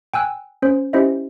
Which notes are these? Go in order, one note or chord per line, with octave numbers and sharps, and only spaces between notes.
G5 G#5 E6 F#6
C#4 C5
C#4 E4 G4 C5 D#5 E5